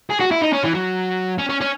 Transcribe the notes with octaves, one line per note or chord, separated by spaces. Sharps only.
G#4
F#4
E4
D#4
C#4
E3
F#3
C#4
C#4
C#4